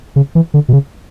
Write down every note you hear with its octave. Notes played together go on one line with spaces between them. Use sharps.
C#3
E3
D3
B2
C#3